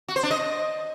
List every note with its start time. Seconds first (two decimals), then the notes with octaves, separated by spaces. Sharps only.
0.08 F#4
0.16 C5
0.23 D4
0.31 D#5